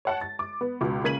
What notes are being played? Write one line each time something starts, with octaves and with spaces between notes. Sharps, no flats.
C#5 F#5 A5
A6
D6
B3
C#2 B2 D6
C#3 A#3 G#6 B6 D#7 F#7